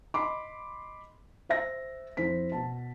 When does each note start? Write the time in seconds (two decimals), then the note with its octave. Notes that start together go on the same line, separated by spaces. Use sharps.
0.14 D#5 B5 C6 D6
1.49 C5 E5 A#6
2.17 F2 E4 C5 B6
2.52 B2 A5